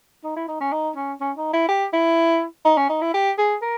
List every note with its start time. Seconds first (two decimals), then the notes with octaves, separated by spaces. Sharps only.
0.24 D#4
0.36 E4
0.48 D#4
0.61 C#4
0.73 D#4
0.96 C#4
1.21 C#4
1.37 D#4
1.53 E4
1.69 G4
1.93 E4
2.65 D#4
2.77 C#4
2.90 D#4
3.01 E4
3.14 G4
3.39 G#4
3.62 A#4